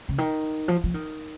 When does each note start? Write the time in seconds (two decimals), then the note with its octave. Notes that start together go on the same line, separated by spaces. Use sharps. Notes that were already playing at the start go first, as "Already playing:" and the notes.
0.09 C#3
0.18 D#3
0.68 F3
0.84 F3
0.94 D#3